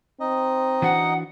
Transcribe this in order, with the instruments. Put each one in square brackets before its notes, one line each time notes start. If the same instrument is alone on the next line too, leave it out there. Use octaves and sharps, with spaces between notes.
[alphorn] C4 [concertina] D#4 D#5
[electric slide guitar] E3 D4 F#4 [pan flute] F#5